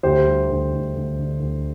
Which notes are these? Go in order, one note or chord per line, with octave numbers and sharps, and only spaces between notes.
D2 G4 C5
G3
D2
D2
D2
D3
D2